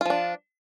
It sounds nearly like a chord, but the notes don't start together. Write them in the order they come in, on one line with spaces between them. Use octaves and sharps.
F4 F3 D4